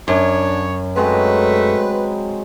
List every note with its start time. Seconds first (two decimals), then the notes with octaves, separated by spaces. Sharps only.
0.08 F#2 D4 C#5
0.96 F#3 G#3 A3 C4 B4